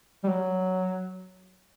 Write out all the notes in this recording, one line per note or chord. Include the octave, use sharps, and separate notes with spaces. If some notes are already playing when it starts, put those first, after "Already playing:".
G3
F#3